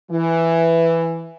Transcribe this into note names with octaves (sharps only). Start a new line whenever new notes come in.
E3